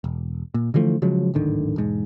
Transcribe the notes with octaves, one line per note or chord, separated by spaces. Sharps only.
E1
A#2
D3 E3 F3 A3
C#3 F3 F#3 G#3
D1 G#1 D3 D#3
E1 G#2